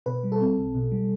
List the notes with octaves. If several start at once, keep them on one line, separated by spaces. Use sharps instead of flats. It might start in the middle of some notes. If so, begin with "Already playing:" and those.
B2 B4
G3
A4
C4
B1
B2
G3